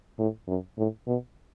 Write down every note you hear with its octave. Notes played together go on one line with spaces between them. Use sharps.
A2
F#2
A2
B2